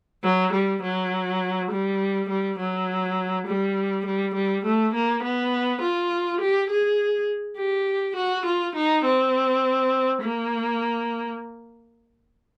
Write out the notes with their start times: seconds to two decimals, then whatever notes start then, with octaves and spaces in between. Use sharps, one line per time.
0.24 F#3
0.53 G3
0.83 F#3
1.71 G3
2.29 G3
2.59 F#3
3.47 G3
4.06 G3
4.35 G3
4.65 A3
4.94 A#3
5.23 B3
5.81 F4
6.41 G4
6.70 G#4
7.58 G4
8.16 F#4
8.46 F4
8.75 D#4
9.05 C4
10.22 A#3